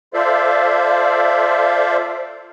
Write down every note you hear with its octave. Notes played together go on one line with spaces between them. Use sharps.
F4 A4 C5 D5 E5 F5